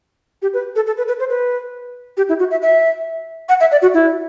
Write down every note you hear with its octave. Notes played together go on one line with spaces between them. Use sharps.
G4
B4
A4
A4
B4
B4
C5
B4
G4
E4
F#4
E5
E5
F#5
E5
D5
F#4
E4